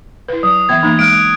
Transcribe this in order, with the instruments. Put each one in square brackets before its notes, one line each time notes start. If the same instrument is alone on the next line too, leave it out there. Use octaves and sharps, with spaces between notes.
[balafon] E4 B4
[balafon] F#3 [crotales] D#6
[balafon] E3 B3 E5 [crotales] G#6
[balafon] E3 A#3 D#4
[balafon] G#3 [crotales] F#6 D7